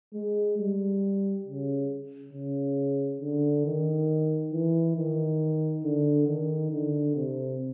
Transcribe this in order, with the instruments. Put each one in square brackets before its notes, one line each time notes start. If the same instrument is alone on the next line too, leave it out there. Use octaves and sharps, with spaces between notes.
[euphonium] G#3
G3
C#3
C#3
D3
D#3
E3
D#3
D3
D#3
D3
C3